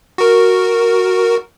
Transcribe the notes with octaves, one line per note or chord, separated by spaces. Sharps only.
F#4 A#4